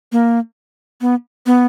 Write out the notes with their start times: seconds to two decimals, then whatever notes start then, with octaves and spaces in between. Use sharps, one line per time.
0.12 A#3
1.01 B3
1.46 B3